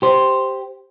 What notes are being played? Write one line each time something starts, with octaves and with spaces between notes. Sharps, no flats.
G4 C5